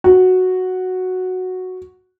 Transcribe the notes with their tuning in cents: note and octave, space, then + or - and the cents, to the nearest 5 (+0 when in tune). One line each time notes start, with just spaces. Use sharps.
F#4 -5